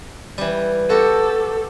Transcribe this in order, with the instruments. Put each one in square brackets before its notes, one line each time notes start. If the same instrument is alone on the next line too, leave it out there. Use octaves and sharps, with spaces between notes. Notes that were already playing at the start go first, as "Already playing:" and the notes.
[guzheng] E3 G3
[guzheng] F#4 G4 [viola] A4